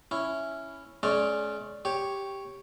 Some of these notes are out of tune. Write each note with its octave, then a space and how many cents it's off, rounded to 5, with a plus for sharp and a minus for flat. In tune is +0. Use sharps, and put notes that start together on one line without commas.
C#4 +0 E4 +0
G#3 +40 C#4 +0 D5 +0
G4 +0 C#5 +0